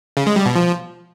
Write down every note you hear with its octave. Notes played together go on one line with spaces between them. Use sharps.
C#3
G#3
G3
B2
F3